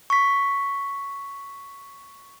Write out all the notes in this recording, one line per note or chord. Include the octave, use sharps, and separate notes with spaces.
C#6 B6